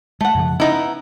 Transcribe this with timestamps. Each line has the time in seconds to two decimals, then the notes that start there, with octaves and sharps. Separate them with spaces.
0.21 G#3 A3 F#5
0.35 F#2 C#3 F3
0.60 B3 C#4 D#4 E4